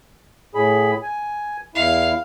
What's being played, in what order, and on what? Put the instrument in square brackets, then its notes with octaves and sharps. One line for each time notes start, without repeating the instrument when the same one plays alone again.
[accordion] A2 G#4 B5
G#5
[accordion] E2 E4 [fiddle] F5